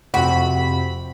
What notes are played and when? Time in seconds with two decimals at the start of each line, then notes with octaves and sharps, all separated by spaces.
0.14 F2 C3 F#4 B5